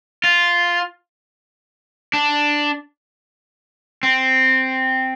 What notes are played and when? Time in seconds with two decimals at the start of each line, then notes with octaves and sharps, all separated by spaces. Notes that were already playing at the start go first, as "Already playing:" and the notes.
0.24 F4
2.13 D4
4.03 C4